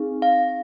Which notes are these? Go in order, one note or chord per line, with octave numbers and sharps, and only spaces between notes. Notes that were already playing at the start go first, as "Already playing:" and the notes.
Already playing: C4 D#4 G#4
F5